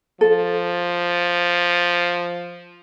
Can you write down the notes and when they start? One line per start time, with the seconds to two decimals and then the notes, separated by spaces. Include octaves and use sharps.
0.21 F3 A4